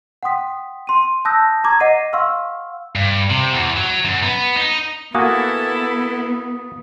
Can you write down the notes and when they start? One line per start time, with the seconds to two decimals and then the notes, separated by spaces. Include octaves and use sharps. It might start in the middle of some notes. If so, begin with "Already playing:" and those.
0.23 F#5 G5 C6 D#6 B6
0.87 C6 D#7
1.25 A5 D#6 E6 F#6 G6 A#6
1.64 A#5 C#6 D6 G#6
1.80 D#5 F#5 A#6 C7 D#7
2.13 F5 F#5 C6 C#6 E6 F6
2.95 G2
3.30 C3
3.52 E2
3.77 F#3
4.05 F#2
4.23 B3
4.57 D#4
5.15 A#3 B3 E4 F#4 A4 G#5 D#6